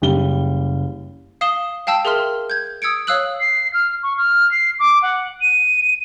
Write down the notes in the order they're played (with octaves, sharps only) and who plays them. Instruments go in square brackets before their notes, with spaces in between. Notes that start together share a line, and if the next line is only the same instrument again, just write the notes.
[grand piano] F#1 G3 G7
[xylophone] F5 D#6 E7 G7
F5 G5 A5 E6
G#4 A#4 E5 C6 F6
G6 G#6
D#6 E6 G#6 C#7 D7
C#5 F5 D#6 E6 F#6 F#7
[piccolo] C7
F6
C#6
F6
C7
D6
F#5
D#7